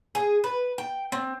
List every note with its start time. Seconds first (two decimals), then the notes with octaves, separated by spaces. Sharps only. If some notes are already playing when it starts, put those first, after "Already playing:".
0.15 G#4
0.44 B4
0.78 G5
1.12 C4